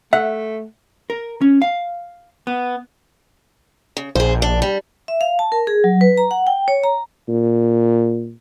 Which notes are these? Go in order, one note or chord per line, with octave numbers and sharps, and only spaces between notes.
A3 E5 F#5
A#4
C#4
F5
B3
C#3
A#1 G#4 C5
D4
G3
E5
F5
A5
A#4
G#4
F#3
B4
A#5
F#5
G5
C#5
A#5
A#2